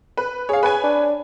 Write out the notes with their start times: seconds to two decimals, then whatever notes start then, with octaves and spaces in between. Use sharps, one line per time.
0.17 B4
0.49 G#4 C#5 F5
0.63 B4 C#5 G#5
0.83 D4